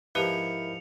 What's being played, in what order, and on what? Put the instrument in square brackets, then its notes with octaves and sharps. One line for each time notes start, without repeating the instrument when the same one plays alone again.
[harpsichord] G#2 F3 [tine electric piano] E4 A#4 [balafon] G4 B4 [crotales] C#7 F7